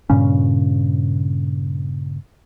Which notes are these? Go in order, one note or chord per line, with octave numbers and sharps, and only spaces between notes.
G2 A#2 C#3 C#4